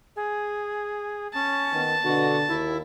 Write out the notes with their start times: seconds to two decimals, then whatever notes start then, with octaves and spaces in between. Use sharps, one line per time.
0.16 G#4
1.34 C#4 A5
1.73 D#3 B3
2.04 B2 D3 F#4
2.48 D#2 E4